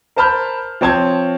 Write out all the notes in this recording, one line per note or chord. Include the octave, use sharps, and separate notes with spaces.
A#4 C5 A5 B5 F6 G6
F3 C4 C#5 A5 G6 G#6